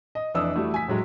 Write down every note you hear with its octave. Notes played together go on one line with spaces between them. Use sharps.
D#5
F1 E3 D4 D#6 E6
G3 A3 E4 F#4
G#5 B6
A2 F#3 G#3